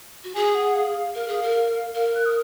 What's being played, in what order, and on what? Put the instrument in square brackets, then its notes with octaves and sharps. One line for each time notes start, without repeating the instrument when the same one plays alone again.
[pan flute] F#4
[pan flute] G#4 [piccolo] G#5
[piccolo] F#5
F5
[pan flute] A#4 [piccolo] F5
[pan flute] G#4
A#4
[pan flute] A#4 [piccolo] F5
[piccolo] F#6
D#6